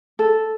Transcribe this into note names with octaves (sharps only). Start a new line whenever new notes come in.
A4